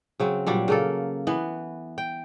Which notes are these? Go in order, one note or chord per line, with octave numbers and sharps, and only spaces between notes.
C#3 F#3 C4
A#2 F#3 G3 D4
C#3 A#3 A4
E3 B3
G5